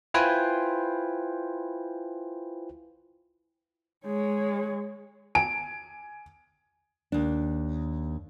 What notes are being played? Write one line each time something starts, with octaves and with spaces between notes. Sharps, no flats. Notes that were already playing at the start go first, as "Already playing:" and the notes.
E4 F4 B4 C5 G5 G#5
G#3 C#5
G#5 D7
D#2 D4